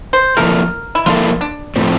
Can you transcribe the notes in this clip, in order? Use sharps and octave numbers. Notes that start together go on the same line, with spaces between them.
C5
F3 A#3 E4 A4 A#4
E4
F3 A#3 E4 F4 A4
D4
A2 F3 A3 C4